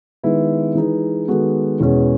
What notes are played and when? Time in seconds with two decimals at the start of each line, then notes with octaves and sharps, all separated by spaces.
0.23 D#3 G#3 B3 E4 B4
0.75 E3 G#3 D#4 G#4 B4
1.28 D#3 G#3 B3 F#4 A4
1.80 E2 B2 G#3 C#4 G#4